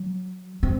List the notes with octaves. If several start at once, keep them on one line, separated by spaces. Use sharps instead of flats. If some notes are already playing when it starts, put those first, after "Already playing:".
Already playing: F#3
C4